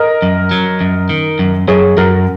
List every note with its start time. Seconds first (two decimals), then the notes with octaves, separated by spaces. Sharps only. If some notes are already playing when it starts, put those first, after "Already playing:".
Already playing: A#4 D#5
0.22 F#2
0.51 F#3
0.81 F#2
1.09 D#3
1.39 F#2
1.68 F#2 G#4 C#5
1.97 F#2 F#4 A#4